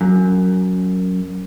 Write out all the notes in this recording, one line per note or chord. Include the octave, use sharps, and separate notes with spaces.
F#2